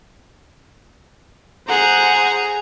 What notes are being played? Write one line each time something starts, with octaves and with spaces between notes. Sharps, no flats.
G#4 C5 F#5 A#5